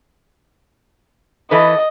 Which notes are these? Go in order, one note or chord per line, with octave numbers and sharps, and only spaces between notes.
E3 A4 B4 D#5